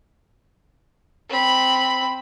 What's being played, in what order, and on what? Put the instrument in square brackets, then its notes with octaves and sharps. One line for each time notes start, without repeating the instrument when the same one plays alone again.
[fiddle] C4 B5